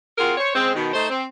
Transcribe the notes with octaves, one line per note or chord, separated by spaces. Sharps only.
C4 F4 F#4 G#4 A#4
C5 C#5
C#3 G#3 C4
B2 D#3
A3 D#4 C5
C4